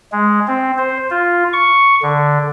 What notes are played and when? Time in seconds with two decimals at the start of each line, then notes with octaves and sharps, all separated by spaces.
0.12 G#3
0.48 C4
0.78 C5
1.10 F4
1.53 C#6
2.03 D3